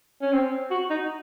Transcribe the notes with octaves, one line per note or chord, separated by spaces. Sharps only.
C#4
C4
F#4
D#4